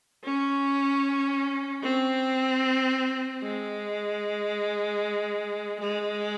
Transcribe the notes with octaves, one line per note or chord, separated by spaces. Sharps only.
C#4
C4
G#3
G#3